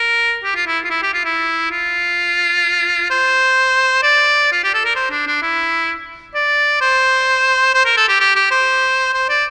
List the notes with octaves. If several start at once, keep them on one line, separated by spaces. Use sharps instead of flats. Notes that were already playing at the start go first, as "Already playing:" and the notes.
Already playing: A#4
G4
F4
E4
F4
E4
G4
F4
E4
F4
C5
D5
F4
G4
A4
A#4
C5
D4
D4
E4
D5
C5
C5
A#4
A4
G4
G4
G4
C5
C5
D5